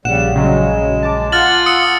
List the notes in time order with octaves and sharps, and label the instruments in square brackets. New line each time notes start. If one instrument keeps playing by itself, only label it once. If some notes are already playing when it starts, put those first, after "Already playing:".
[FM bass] A#1 [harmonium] C#3 G3 [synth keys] F#5 [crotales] E7
[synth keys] C#3 F#3 [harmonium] G#3
[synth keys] A5 D6
[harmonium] F4 F#5 [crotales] F6 A6 F#7
[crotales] D#6 E6 C#7